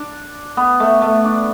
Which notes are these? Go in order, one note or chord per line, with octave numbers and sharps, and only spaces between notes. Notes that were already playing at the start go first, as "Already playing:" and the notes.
Already playing: D4
B3
A3
A3
D4